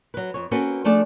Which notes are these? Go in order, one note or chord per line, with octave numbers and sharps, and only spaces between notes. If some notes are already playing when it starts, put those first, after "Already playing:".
F#3 B4
F2 C#5
A#3 C4 C#4 F#4 A4 B4
F3 A3 D4 G#4 A4 D5